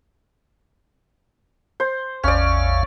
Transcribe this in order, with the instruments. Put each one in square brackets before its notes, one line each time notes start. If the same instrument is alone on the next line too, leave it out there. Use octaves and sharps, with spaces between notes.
[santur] C5
[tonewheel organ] A1 E2 F5 [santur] C#4 D5